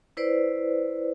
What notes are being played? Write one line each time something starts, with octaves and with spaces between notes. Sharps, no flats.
E4 B4 C5 D5